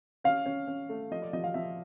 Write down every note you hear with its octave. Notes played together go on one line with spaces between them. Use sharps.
C#4 F5
C#4
C#4
A3
F3 D#5
D5
F3 D#5
F5
F3 E5